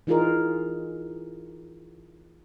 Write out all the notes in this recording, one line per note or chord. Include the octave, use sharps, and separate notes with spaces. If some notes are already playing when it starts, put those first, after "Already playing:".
E3 D#4 F4 G#4 A#4